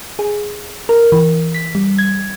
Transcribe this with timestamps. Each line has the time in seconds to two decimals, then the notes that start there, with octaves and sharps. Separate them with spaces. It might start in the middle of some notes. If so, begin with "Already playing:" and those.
0.19 G#4
0.89 A#4
1.12 E3
1.54 B6
1.75 G3
1.98 G#6